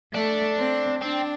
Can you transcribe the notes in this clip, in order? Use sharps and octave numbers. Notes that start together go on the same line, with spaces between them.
A3 D4
C4
C4 D4